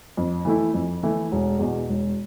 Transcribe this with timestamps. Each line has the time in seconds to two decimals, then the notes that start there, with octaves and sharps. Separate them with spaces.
0.17 F2
0.45 E3 A3 E4
0.74 F2
1.03 E3 A3 E4
1.32 E1
1.59 E2 B2
1.89 E1